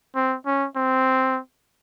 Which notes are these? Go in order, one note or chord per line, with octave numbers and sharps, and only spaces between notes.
C4
C#4
C4